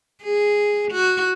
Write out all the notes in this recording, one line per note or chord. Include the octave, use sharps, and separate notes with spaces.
G#4
F#4